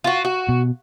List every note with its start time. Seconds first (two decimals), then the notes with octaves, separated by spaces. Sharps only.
0.04 F4 F#4
0.25 F#4
0.49 B2